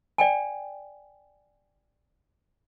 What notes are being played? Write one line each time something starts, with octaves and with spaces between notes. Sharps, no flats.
D5 G5 G#5